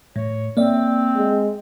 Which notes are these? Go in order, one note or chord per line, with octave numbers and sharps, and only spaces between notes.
A2 C#5
A#3 C4 D5 E5
G#3